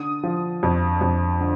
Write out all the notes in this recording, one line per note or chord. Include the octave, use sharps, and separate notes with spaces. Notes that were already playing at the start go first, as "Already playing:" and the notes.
Already playing: D3 D#6
F3
F2
F2
D3